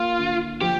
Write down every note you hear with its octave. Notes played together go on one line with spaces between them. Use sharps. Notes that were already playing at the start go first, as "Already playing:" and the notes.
Already playing: A#3 F4
D3
F3 G4